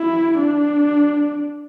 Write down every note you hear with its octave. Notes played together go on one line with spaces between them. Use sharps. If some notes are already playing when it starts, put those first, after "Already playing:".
Already playing: E4
D4